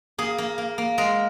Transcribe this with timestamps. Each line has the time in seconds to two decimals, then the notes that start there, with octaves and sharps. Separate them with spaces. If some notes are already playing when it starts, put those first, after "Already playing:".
0.18 A#3 G#4
0.38 A#3
0.58 A#3
0.78 A#3
0.98 G#3 A#4